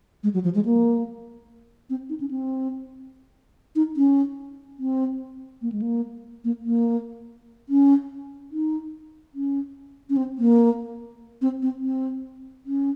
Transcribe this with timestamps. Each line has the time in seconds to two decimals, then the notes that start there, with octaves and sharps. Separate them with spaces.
0.23 G#3
0.34 F#3
0.44 F3
0.55 G#3
0.65 A#3
1.90 C4
2.09 D#4
2.20 C#4
2.31 C4
3.76 D#4
3.97 C#4
4.79 C4
5.62 A#3
5.72 G#3
5.82 A#3
6.44 A#3
6.65 A#3
7.69 C#4
8.52 D#4
9.35 C#4
10.10 C#4
10.17 C4
10.38 A#3
11.42 C4
11.62 C4
11.83 C4
12.66 C#4